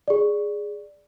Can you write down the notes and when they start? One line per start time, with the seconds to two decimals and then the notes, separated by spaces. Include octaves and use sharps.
0.08 G#4 D5